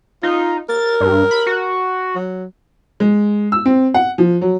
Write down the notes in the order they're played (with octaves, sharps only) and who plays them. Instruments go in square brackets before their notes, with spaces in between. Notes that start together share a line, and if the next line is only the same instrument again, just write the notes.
[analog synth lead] D#4 [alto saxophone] F4
[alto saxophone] A#4 [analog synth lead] A6
[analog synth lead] G2
B5
F#4
[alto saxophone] F#3
[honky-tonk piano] G#3
E6
C4
F#5
F3
F#3